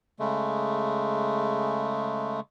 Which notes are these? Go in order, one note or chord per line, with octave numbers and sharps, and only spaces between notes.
C#3 G#3 A3